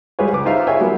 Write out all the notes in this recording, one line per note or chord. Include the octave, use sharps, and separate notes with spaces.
G3 G#3 F4 G#4 B4 C#5
C#2 B4 D6
D#4 F4 C5 E5 F5
G#4 B4 C#5 E5 G5 G#5
F#3 G3 A#3 B3